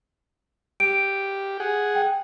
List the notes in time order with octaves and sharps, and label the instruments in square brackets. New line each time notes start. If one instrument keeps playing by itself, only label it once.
[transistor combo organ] G4 [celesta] D7
[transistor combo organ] G#4 F#5
[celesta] G5